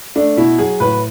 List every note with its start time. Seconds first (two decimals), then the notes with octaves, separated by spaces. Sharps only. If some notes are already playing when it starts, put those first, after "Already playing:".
0.16 A3 D4
0.37 B2 E4
0.58 F#3 G#4
0.80 A2 B4